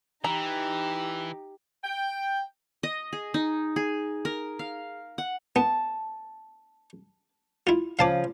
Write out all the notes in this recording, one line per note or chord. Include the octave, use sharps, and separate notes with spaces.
E3 D#4 G4 A#5
G5
D#5
G#4
D#4
G#4
A#4
F5
F#5
B3 A5
E4 F4
C#3 F3 F5 A5 D6